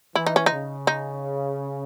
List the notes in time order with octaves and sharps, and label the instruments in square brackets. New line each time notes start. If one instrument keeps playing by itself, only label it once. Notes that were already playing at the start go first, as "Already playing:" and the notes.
[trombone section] E3 [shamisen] E4
[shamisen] D#4
C#4
D#4
[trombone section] C#3
[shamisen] D#4